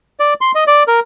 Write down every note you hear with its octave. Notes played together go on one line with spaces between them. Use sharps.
D5
C6
D#5
D5
A#4